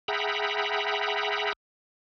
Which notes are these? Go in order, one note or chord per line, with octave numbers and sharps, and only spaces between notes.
G#4 E5 F#5 G5 A#5 B5